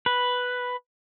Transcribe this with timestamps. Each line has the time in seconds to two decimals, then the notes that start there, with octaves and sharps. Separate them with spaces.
0.06 B4